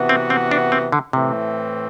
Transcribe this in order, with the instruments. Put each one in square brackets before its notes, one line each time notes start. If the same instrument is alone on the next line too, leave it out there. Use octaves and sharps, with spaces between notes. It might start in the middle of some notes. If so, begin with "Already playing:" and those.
Already playing: [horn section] C3 E3 B3 F#4
[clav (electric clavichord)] C4
C4
D4
C4
D3
[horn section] A2 E3 A3 C4 [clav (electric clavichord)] C3